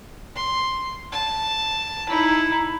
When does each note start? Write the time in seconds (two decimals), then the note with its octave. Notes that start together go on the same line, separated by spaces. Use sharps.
0.35 C6
1.12 A5
2.09 D#4 E4